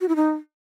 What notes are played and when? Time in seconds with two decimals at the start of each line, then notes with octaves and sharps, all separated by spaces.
0.01 F#4
0.09 E4
0.16 D#4